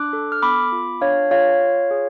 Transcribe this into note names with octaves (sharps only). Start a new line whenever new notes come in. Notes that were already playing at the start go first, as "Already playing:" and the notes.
Already playing: D4 D6 F#6
A4
F6
B3 B5 D6
F4
D4 C#5 F5
F4 C#5 F5
F4
G#4